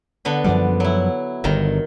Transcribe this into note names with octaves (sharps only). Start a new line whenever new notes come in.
D3 B3 B5
F#2 F3 G3 D5
F#3 E4
G1 G2 D3 D#3 A#5